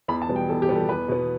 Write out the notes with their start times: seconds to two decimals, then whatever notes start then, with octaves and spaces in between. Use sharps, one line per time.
0.08 E2 B5
0.22 A5
0.29 B2 G3 B3
0.36 G5
0.49 E2 A4
0.62 G4
0.69 B2 G3 B3
0.75 A4
0.89 E2 B4
1.08 B2 B3